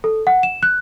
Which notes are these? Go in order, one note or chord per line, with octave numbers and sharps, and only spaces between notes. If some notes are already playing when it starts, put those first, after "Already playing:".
A4
F#5
E7
F#6